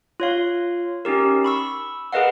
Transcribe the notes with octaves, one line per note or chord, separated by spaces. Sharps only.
F4 C#5 F5
C#4 D#4 G4 A#4
B5 C#6 E6
G#4 A#4 B4 D#5 F5 F#5